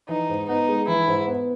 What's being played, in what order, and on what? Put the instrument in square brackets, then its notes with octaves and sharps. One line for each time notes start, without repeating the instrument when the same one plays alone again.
[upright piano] E3 [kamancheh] D#4
[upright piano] G#2
[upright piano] B3 [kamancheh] D#4
[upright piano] G#3
[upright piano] E3 [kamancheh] E4
[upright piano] G#2
B3